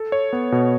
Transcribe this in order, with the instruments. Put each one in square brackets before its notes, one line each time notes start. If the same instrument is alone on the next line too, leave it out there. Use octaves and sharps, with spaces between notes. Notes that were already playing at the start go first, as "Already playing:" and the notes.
Already playing: [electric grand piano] A4
C#5
B3
B2